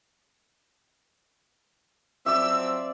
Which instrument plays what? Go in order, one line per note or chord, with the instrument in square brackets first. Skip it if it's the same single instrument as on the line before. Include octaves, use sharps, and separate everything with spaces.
[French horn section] F3 F#3 C4 [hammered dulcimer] D5 E5 [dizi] E6